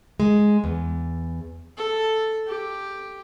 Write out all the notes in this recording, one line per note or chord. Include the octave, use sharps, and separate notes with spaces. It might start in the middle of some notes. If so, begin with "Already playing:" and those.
G#3
E2
A4
G4